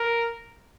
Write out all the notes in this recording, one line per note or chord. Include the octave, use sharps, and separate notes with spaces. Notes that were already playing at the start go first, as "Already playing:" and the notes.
Already playing: A#4